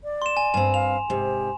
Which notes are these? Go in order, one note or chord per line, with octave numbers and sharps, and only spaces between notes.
D5
C6 E7
G#5
G2 C4 G#5
F5 F7
G#2 C3 G4